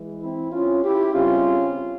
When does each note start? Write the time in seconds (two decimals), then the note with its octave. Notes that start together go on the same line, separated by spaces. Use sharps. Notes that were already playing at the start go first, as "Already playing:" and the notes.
Already playing: E3 G#3
0.22 C4 E4
0.52 C#4 F4
0.83 E4 G4
1.14 C#3 G3 C4 C#4 F4